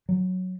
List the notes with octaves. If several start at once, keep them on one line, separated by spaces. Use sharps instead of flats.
F#3